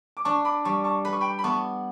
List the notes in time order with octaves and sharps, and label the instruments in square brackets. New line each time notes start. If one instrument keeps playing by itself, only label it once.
[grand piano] D6
[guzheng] D4 [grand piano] A5 C#6
[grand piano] B5 D6
[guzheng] G3 [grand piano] A5 C#6
[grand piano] A5 C#6
[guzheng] B4 [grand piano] B5
[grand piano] C#6
G5 B5
B5
[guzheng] B3 [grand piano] A5 C#6